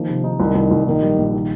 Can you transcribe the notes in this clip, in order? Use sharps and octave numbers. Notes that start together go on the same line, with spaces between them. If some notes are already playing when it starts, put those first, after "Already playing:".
Already playing: D#3 F3 A#3
C3
D#4
C2 D#3
C2
C2
A#1 D#3
G3
A#1
D#3